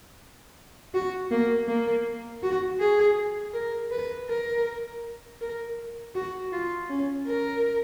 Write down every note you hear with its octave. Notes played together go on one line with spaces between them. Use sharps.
F#4
A#3
A#3
F#4
G#4
A#4
B4
A#4
A#4
F#4
F4
C#4
A#4